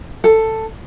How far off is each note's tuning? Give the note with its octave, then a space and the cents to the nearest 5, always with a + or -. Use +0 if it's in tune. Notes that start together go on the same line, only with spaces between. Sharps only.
A4 +10